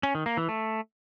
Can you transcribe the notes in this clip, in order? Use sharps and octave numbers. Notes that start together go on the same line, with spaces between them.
C#4
D#3
A#3
E3
A3